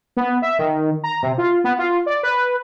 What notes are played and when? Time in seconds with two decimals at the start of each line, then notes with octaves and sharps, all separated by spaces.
0.17 B3
0.42 E5
0.59 D#3
1.04 A#5
1.23 C3
1.38 F4
1.64 B3
1.79 F4
2.06 D5
2.23 B4